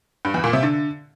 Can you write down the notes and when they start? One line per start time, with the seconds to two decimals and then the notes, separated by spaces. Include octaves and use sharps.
0.25 G2
0.34 E2
0.44 A#2
0.53 C3
0.63 D3